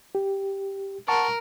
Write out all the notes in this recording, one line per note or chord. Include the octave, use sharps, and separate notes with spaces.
G4
A#4 F#5 A5 C#6